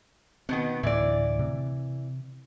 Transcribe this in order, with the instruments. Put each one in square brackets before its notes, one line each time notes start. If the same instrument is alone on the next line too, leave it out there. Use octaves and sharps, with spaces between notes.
[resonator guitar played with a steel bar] B2 D#3 B3 [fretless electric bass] C4
[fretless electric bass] D2 A2 [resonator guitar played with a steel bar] E3 D5
[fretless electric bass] C3